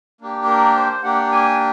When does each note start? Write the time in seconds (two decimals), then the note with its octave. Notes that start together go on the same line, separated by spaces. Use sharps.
0.21 A#3 D4 G4
0.48 A#4
0.76 C5
1.03 A#3 D4 G4 F#5
1.32 G#5